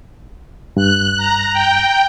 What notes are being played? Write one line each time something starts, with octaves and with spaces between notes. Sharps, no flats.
G2 F#6
A#5
G5